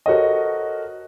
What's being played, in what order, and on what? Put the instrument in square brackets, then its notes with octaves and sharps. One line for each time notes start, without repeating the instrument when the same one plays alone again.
[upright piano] F#4 A4 A#4 C5 C#5 D#5